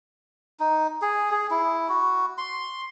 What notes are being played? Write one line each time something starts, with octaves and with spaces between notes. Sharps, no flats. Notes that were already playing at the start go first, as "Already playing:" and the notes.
D#4
G#4
G#4
E4
F#4
C6